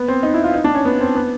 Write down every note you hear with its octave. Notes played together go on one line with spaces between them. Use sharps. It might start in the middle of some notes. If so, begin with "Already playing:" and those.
Already playing: B3
C4
D#4
E4
F4
D#4
D4
C#4
B3
C4
B3